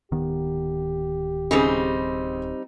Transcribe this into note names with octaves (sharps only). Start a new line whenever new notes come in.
D1 D#3 B3 G4
C#3 G3 C4 D#4 G#4